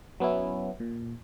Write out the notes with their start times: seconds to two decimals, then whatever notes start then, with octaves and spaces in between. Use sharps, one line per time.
0.20 F#3 B3 C#4 E4
0.80 A#2